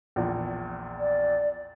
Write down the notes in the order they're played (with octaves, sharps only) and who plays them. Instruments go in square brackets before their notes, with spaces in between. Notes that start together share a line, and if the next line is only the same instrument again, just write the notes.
[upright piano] A#1 E2 A#2
[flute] D5